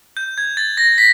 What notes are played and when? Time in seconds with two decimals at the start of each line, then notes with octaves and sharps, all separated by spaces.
0.17 G6
0.38 G#6
0.57 A6
0.77 A#6
0.98 B6